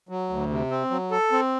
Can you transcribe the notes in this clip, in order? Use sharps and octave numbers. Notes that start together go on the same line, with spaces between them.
F#3
D2
C3
C4
F#3
A4
C4